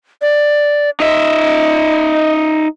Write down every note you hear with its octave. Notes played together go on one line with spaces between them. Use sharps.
D5
D#4 D#5 E5